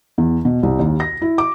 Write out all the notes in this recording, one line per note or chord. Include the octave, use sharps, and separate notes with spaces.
E2
B2
C2
D#2
A#6
E4
D6